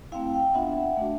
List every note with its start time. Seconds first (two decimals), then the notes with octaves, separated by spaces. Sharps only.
0.12 A3 C4 E4 F5 G5
0.34 F5 G5
0.54 B3 D4 F4 E5 F#5
0.97 A3 D4 F#4